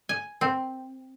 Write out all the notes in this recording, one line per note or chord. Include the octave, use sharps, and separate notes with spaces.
G#5
C4